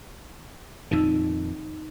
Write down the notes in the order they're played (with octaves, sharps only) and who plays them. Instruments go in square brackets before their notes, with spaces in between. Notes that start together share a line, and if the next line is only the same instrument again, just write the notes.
[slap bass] F2 A#2 D#3 [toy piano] D#4 D#5 E6